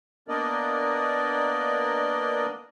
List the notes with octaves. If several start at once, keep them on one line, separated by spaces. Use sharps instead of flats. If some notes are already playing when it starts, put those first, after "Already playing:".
A#3 B3 D4 A#4 D5 D#5